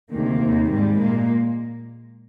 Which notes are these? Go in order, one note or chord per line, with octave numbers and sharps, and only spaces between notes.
D2 C3 D#3 G#3 A#3
D#2 D#3 G#3
G#2 G3 G#3
A#2 G#3 A#3